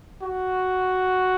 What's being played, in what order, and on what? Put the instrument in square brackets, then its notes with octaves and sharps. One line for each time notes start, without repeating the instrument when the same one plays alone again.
[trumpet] F#4